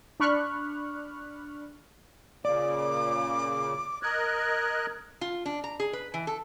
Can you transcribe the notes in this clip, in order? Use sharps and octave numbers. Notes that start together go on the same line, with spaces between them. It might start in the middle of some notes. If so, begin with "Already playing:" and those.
D4 D5 B5 C#6 F6 F#6
A#2 C#3 A#3 D5 D6
A#4 D#5 F#6 G#6
F4
D4
A#5
G#4
B4
E3
A4